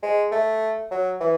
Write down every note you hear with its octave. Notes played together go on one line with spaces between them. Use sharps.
G#3
A3
F#3
E3